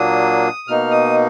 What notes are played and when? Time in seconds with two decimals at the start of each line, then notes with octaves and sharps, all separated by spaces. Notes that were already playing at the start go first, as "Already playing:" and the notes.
Already playing: A#2 F#3 A#3 D4 D#6
0.68 B2 A#3 D#4 F6
0.91 D#6